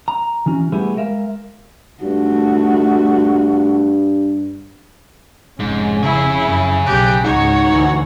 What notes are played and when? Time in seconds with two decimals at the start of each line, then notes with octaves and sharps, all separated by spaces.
0.08 A#5
0.46 E3 C#4 F#4
0.72 G3 A3 B3 E4 G4 G#4
0.97 G#3 A#4 E5 F5
2.03 G2 A3 F#4
5.60 F1 G#2 C#4
6.03 C#3 E4 G#4 C#5
6.47 F#2
6.86 B1 G4 F#6
7.24 C#2 G#2 D#4 F#4 C#5
7.70 D2 E3